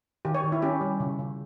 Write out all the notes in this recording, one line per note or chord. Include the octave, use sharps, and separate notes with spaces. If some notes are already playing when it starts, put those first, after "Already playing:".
D#3 G4
C#5
D#3
E4
C#4 G4
G3
C#3
C#3